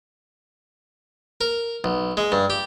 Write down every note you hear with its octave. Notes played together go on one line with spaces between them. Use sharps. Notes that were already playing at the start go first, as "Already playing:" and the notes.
A#4
B1
G#3
G2
G4